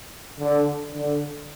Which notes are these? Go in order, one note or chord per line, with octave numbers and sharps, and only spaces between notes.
D3
D3